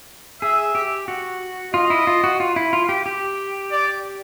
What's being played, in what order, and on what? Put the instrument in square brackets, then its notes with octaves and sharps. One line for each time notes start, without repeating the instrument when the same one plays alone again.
[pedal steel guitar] G#4 [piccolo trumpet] E5
[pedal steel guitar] G4
F#4
[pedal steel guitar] F4 [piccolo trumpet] D#5
[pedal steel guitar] E4
F4
F#4
F4
E4
F4
G4
G4
[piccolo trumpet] D5